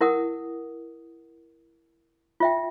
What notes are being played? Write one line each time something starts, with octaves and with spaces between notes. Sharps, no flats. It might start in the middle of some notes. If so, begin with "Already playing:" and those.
E4 A#4 F#5 D#6
F4 E5 G5